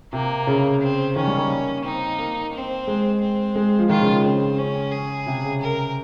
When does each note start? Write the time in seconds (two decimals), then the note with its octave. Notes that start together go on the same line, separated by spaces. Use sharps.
0.13 C3 A#3
0.47 C#3
0.81 C4
1.16 D#3 C#4
1.28 G3
1.38 A#3
1.84 C4 D#4
2.19 A#3
2.53 C4
2.87 G#3
3.21 C4
3.55 G#3
3.79 F3
3.89 D#3 F4
4.01 C#3
4.13 F3
4.24 C#3 C4
4.58 C#4
4.92 G#4
5.26 C3
5.44 C#3
5.61 A#4